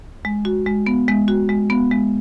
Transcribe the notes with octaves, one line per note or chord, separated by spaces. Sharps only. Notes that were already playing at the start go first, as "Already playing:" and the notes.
G#3
F#4
G#3
B3
G#3
F#4
G#3
B3
G#3